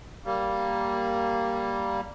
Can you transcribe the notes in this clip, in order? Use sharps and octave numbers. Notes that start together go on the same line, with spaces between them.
G3 A#3